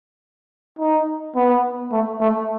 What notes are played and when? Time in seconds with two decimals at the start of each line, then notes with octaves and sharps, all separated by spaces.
0.79 D#4
1.35 B3
1.92 A3
2.20 A3